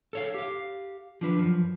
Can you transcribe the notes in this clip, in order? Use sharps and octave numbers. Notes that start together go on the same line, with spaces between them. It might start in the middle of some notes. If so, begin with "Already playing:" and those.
A4 C#5 F5
G4 F5
F3 D4 B4
F#2 F3